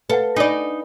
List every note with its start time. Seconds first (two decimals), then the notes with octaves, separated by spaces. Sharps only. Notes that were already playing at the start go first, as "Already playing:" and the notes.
0.10 A4 B4 F5 F#5
0.36 D4 D#4 A4 D5 B5